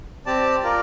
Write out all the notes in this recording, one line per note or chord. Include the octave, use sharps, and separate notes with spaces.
C4 G4 D5 A5
F4 A#4 D5